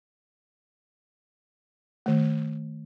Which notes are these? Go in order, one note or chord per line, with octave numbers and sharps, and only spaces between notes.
D#3 A3